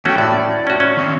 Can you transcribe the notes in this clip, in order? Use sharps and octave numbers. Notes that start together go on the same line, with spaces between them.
E2 A3 C#4 F#4 G5
A2 D5
C#4 F#4
C#4
D#3 C4